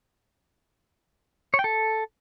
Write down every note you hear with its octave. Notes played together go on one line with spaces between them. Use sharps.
C#5
G5
A4